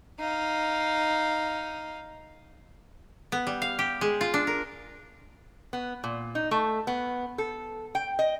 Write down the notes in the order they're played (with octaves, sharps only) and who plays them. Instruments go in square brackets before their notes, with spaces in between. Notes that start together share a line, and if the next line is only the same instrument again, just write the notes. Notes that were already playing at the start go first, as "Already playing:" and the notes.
[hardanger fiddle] D#4 F5
[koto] B3
G3
F5
G4
G#3
F4
D4
A#4
[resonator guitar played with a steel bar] B3
A#2
D#4
A3
B3
A4
G5
D#5